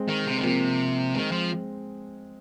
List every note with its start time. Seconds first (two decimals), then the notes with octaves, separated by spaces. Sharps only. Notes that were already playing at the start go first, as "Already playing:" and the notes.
Already playing: G#3 C4
0.08 D#3
0.26 C3
0.37 D#3
0.43 C3 F3 A#3
1.14 D#3 G#3 C4
1.32 F3